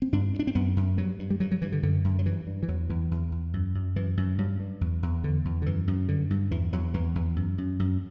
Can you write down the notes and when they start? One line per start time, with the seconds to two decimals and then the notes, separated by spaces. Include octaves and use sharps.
0.02 C4
0.13 G2 D4
0.34 G2
0.39 D4
0.47 C4
0.55 F#2 B3
0.76 F#2
0.97 G2 F#3
1.19 G2
1.30 G3
1.40 G2 F#3
1.51 F#3
1.62 G2 E3
1.72 D3
1.83 F#2 D3
2.04 F#2
2.19 F#3
2.26 G2 E3
2.47 G2
2.63 E3
2.68 E2 F#3
2.89 E2 E3
3.11 E2
3.32 E2
3.53 F#2
3.74 F#2
3.96 F#2 E3
4.17 F#2
4.38 G2 F#3
4.60 G2
4.81 E2
5.03 E2
5.24 E2 D3
5.45 E2
5.62 D3
5.66 F#2 E3
5.87 F#2
6.08 G2 D3
6.30 G2
6.51 E2 E3
6.73 E2 F#3
6.94 E2 E3
7.15 E2
7.36 F#2
7.58 F#2
7.79 F#2